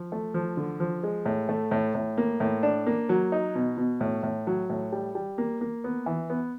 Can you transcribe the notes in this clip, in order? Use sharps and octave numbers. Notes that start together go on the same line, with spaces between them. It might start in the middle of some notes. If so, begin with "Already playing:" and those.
Already playing: F3
A3
F3
D3
F3
G#3
A2
A3
A2
A2
A#3
A2
D4
A#3
F#3
D#4
B2
B2
A2
A2
F#3
A2
G3
G3
A#3
A#3
B3
E3
B3